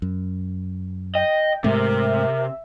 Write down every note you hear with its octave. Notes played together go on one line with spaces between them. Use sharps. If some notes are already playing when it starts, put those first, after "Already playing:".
F#2
D#5 G5
G#2 C3 G#3 A3 A#4 E5